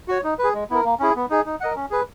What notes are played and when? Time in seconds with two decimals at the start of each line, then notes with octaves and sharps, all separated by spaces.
0.08 F#4 C#5
0.24 D#4
0.39 G#4 B4
0.54 G#3
0.70 B3 E4 A#4
0.85 A#3
1.00 C#4 E4 G#4
1.16 B3
1.30 D#4 G#4
1.46 D#4
1.61 A#4 D#5 F#5
1.76 C#4
1.91 G#4 B4